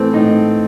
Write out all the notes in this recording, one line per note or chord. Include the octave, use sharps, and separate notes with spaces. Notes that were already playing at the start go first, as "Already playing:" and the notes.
Already playing: A2 E3 A3 C4
A2 D#4